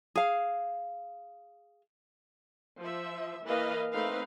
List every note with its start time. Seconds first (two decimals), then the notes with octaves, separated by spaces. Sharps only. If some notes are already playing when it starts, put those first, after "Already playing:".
0.15 G#4 F5
2.79 F3 E5
3.44 E3 A#3 B4 D#5 F5
3.92 A3 C4 D#4 B4 F5